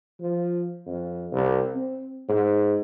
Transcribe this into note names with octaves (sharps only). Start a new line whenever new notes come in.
F3
F2
C2
C4
G#2